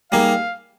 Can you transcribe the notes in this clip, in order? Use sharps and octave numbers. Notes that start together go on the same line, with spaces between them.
G3 A#3 D#4 G#4 F5